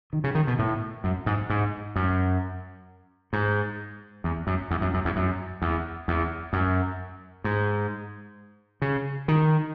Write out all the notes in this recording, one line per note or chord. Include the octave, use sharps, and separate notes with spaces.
D#3
C#3
D#3
B2
A2
F#2
G#2
G#2
F#2
G#2
E2
F#2
E2
F#2
F#2
E2
F#2
E2
E2
F#2
G#2
C#3
D#3